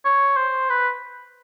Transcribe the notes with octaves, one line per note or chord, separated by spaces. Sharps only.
C#5
C5
B4